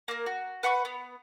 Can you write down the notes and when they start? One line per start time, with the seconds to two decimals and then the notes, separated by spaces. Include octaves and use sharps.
0.08 A#3 A#4
0.26 F#4
0.63 B4 F#5 B5 C#6
0.85 B3